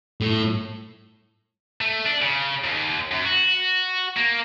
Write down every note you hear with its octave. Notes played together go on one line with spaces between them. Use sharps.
A2
A3
D4
C#3
D#2
F#2
F#4
A#3